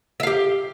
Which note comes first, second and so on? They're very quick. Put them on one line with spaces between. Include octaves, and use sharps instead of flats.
E5 F5 G4